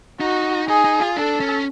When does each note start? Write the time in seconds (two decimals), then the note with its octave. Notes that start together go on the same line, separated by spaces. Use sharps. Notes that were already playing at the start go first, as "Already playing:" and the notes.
0.20 D#4 F#4
0.68 D#4 G#4
0.84 D#4
1.00 F4
1.16 D4 A4
1.40 C#4